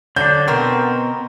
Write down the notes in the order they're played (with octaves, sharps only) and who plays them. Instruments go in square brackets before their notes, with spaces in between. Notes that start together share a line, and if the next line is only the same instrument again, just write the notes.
[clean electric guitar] D3 D4 [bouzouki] F#3 [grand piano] G6
[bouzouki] B2 B3 A#4 [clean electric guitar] C4